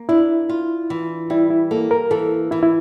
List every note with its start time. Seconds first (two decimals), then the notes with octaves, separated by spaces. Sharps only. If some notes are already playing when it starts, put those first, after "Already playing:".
Already playing: A#3
0.09 D4 E4
0.49 F4
0.90 E3
1.30 G3 E4
1.50 E4
1.71 A#3 A4
1.91 A#4
2.11 E3 A4
2.51 E3 E4
2.63 E4